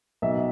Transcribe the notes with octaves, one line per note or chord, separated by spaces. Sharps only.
B1 E5